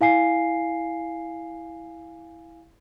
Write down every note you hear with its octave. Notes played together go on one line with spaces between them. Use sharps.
E4 F5 G#5 C7